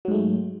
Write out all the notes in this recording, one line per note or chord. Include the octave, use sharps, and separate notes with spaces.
G#2 F#3 G#3 A3